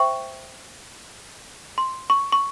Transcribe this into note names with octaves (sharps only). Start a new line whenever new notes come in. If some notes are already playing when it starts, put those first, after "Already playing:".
Already playing: C5 E5 G5 C#6
C6
C#6
C#6